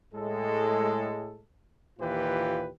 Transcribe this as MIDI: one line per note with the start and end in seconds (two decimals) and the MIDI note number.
0.14 1.40 45
0.14 1.40 56
0.14 1.40 69
2.00 2.69 39
2.00 2.69 46
2.00 2.69 52
2.00 2.69 65
2.00 2.69 67
2.00 2.69 71